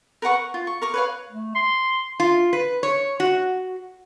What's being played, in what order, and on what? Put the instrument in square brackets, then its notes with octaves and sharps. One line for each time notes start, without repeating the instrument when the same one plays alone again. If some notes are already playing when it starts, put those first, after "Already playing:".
[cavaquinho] A#4 B4 F#5 C#6
C#6
F4
C#6
A#4 C#6 D6
B4 C#5 F5
[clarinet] A3
C6
[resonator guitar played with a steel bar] F4
B4
C#5
F#4